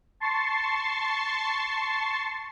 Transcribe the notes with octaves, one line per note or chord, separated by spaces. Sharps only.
A5 C6 C#6 A6 C7